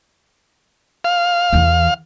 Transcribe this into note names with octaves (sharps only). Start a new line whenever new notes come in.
F5
E2 E3